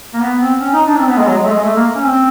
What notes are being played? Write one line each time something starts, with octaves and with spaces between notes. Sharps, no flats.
A#3
B3
C4
C#4
D#4
D4
C4
B3
G#3
F#3
G#3
A3
G#3
A3
A#3
C#4
C4